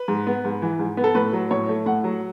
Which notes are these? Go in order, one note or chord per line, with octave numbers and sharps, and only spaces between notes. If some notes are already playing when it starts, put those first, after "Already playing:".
Already playing: B4
G#2
B3
G#2
E3
G#2
B3
A4
A2 B4
F#3
A2 C#5
A3
A2 F#5
F#3